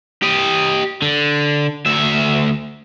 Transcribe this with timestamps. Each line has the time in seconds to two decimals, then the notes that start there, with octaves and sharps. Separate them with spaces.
0.23 G4 D#5
1.02 D3
1.86 D2 E5